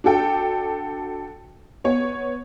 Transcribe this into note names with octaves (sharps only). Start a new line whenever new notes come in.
D4 F#4 A4 G5
B3 C#5